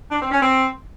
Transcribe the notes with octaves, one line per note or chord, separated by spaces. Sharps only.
D4
C4
C#4
C4